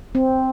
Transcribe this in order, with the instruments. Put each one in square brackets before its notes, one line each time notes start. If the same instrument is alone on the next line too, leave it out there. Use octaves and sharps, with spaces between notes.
[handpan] C4